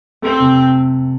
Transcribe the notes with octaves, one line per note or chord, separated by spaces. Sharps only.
A3 C4
C3